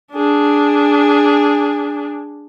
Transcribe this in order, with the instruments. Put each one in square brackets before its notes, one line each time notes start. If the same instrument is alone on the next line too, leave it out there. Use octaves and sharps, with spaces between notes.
[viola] D4 G#4